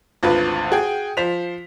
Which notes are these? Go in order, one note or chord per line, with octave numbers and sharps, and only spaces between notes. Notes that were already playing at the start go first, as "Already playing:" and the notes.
G#1 D2 F4 B4
F#4 G#4 G5
F3 C5 B6 F7